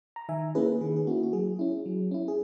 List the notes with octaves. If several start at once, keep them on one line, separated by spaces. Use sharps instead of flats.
A#5
D#3 E5 G#5
A#3 C#4 E4 G#4 B4
D#3 G#4
G#4
A#3 C#4 E4 F#4
F#4
F#3 G#4
C#4 E4
F#3
C#4 E4
G#4